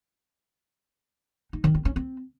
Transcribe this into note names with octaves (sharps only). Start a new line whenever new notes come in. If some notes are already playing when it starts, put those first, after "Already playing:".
D#4
D#3
C4
C#4
C4